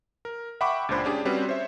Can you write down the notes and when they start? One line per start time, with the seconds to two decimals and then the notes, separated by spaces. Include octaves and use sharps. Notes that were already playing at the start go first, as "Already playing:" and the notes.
0.25 A#4
0.61 E5 F#5 G5 B5 C#6 D6
0.89 C#2 A#2 D4 C5 B5
1.04 C#4 D4 G4 G#4
1.25 G3 C4 C#4 F#4 B4 C5
1.49 C5 C#5 E5